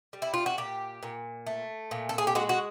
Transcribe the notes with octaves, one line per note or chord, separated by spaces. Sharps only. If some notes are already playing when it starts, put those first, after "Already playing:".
G3
E4
F4
F#4
A#2 G4
A#2
A3
A#2
A4
G#4
G4
G#3 F#4
F#4